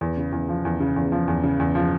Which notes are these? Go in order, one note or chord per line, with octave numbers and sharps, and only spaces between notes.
E2
C#3
E2
F3
E2
C#3
E2
F3
E2
C#3
E2
F3